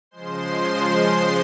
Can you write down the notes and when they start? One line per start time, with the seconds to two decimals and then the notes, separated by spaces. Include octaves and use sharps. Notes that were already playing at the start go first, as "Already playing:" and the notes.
0.11 C#3 F3 G#3 C5 C6
0.60 C6